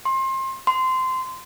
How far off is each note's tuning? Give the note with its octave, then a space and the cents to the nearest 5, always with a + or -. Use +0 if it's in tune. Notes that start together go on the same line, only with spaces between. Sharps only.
C6 +30
C6 -20